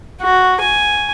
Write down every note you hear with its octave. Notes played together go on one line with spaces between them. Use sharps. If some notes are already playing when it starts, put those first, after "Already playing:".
F#4
G#5